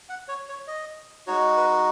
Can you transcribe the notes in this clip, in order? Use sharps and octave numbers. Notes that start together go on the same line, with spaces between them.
F#5
C#5
C#5
D#5
G#3 D#4 F#4 C#5
B4